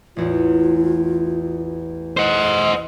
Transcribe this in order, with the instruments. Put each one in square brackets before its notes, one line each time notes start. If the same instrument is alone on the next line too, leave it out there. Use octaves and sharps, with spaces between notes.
[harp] A1 E2 [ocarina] F4
[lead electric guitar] C5 F#5 [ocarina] D#5